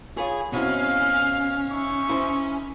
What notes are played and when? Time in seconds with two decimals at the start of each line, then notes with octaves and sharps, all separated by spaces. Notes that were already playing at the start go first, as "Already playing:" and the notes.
0.17 F4 G#4 B4 C#5
0.53 B2 C4 C#4 E4 F5
1.70 D#4 E5 C#6
2.09 E4 C5